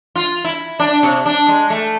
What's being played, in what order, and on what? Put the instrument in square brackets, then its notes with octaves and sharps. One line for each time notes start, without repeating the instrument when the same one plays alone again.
[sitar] F4
E4
D4
C3
D4
G#3
A3